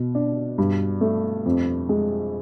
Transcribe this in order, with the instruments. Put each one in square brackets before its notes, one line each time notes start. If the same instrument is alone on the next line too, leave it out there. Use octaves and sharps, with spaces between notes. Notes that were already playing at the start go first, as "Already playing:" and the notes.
Already playing: [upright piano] B2
D4
G2
A3
F2
G#3